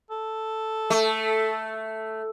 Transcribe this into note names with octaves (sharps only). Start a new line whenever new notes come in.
A4
A3